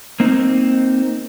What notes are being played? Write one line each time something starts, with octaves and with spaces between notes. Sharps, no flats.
A#3 C4 D#4